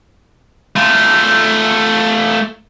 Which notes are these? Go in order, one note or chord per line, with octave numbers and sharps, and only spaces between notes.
A3 F4